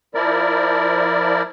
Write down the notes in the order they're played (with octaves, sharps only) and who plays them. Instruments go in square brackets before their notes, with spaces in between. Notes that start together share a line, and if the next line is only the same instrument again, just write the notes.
[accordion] F3 E4 A#4 D5